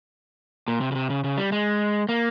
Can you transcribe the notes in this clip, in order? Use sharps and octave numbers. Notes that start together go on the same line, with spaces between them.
A#2
C3
C#3
C3
C#3
C#3
G3
G#3
A#3